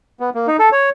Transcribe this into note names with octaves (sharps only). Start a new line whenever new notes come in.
B3
A#3
D#4
A4
C#5